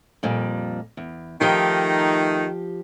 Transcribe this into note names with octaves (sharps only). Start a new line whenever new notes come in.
F2 A#2 G3
E2
D#3 F3 A3 D#4 G4